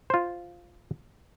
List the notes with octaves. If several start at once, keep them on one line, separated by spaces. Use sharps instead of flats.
F4 C5